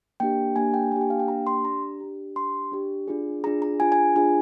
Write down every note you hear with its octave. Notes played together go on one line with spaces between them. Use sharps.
A#3 D4 G4 G5
A#3 D4 G4 G#5
G5
A#3 D4 G4 G#5
G5
F5
G5
A#3 D4 G4 A#5
C6
D4 G4 A#5
D4 G4
D4 G4 C6
D4 G4
D4 F4 G#4
D4 F4 G#4 A#5
A#5
D4 F4 G#4 G#5
G#5
D4 F4 G#4 G#5